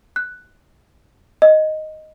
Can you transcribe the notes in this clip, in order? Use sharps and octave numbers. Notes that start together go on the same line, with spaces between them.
F#6
D#5